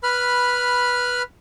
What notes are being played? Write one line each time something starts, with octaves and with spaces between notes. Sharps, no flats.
B4 B5 F6